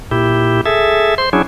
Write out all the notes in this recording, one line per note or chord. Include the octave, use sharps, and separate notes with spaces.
A#2 E4 G4
G#4 A4 E5
C5 C6
F#3 C#4 D4 E4 G#4